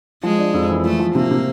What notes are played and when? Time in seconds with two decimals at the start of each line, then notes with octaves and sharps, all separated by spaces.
0.23 F3 G#3
0.39 D4
0.54 F2
0.69 E3
0.84 F3 A3
0.99 F3
1.15 C3 A#3
1.31 C3